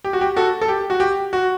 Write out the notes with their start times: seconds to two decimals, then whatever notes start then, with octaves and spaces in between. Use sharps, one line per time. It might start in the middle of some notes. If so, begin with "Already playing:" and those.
0.04 G4
0.13 F#4
0.21 G4
0.36 F#4 A4
0.61 A4
0.68 G4
0.90 F#4
1.00 G4
1.33 F#4